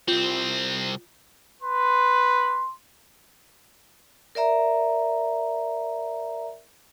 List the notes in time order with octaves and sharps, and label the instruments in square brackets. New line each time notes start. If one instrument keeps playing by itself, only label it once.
[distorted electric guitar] C2 C4 [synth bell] F4 G6
[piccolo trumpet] B4 [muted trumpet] C6
[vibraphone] A#4 D5 E5 A#5